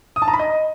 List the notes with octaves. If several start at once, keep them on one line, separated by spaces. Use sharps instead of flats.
D#6
A5
A#5
B5
D#5